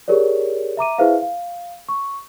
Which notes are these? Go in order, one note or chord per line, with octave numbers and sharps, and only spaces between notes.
G4 G#4 A#4 C#5 D5
E5 A#5 D6 D#7
E4 G#4 B4 C5 E5 F5
F5
C#6